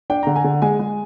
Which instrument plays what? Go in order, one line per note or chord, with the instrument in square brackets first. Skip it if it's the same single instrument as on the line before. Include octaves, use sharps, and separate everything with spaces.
[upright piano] D4 G5
D3 A#5
G#5
D3
G#3 G#5
G#3